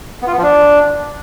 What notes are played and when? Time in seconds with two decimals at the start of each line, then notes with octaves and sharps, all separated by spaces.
0.22 B3
0.27 F4
0.33 B3
0.38 F3
0.43 D4